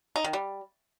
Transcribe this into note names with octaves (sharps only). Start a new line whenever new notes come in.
D#4
D#3
G3